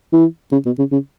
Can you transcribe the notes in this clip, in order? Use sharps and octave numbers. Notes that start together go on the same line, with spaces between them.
E3
C#3
B2
C#3
C#3